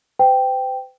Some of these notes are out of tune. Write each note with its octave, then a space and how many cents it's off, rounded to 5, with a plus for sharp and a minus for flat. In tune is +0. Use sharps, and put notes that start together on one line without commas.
C5 -45 G5 +0